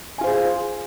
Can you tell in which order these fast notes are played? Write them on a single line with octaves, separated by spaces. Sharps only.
G#5 F4 C5 G#4